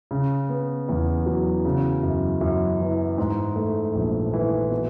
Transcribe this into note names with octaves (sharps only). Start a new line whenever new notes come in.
C#3
B3
E2
F#3
C#3
F#2
F#2
E3
G#2
A3
A#1
E3
B2